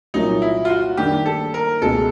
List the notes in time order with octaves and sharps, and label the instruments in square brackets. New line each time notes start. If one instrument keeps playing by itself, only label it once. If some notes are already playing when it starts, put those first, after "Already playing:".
[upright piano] C2 A#2 F#3 A#3 [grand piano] D#4
[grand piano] E4
F4
F#4
[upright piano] D#3 G3 A#3 D4 [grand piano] G4
[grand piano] A4
A#4
[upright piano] C#2 B2 G#3 [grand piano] A4